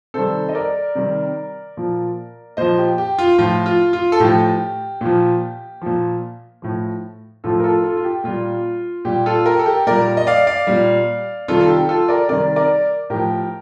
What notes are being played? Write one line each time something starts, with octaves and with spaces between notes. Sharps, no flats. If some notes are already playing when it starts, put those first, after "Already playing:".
C3 D#3 G3 A4 C5
D#5
A#4 D5
C3 D#3 G3
A#2 F3
A#2 F3 C5 D#5
G4
G4
F4
A2 F3 F4
F4
F4
A4
A2 F3 G4
A#2 F3
A#2 F3
A2 F3
A2 F3 F4 A4
A#4
F4 A4
F4 A4
F4
G4
A#2 G3 F4
A#2 G3 G4
F4 A4
G4 A#4
A4
G4 A#4
A#2 G3 A#4 D5
D#5
D5 F5
D5 F5
A#2 G3
C3 D#3 G3 F4 A4
A4
G4
F4 A4
A#4 D5
C3 D#3 G3 A#4 D5
A#4 D5
A2 F3 G4 A#4